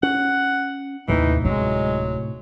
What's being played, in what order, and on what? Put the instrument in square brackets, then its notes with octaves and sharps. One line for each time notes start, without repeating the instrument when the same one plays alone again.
[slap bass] C#4 [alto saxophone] F#5
[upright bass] D#2 [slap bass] A2 C3 A3 [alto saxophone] E3 [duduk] D#4
[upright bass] D1 D#4 [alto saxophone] F#3 [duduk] G#3